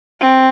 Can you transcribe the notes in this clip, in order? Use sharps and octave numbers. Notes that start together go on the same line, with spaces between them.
C4